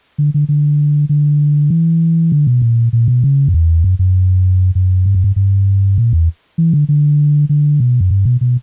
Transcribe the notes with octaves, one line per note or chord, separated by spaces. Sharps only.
D3
D3
D3
D3
E3
D3
B2
A#2
A#2
B2
C#3
F#2
E2
F#2
F#2
F#2
G2
F#2
G2
G2
A#2
E2
E3
D3
D3
D3
B2
F#2
G2
B2
B2